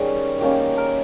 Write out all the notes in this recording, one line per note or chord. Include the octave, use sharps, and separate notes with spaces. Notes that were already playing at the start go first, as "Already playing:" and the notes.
Already playing: D#3 G3 C#4 G#4
D#3 A#3 C#4 G4
A#4